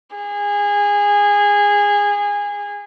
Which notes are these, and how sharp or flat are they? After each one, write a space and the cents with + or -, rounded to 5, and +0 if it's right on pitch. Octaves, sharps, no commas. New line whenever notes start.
G#4 -20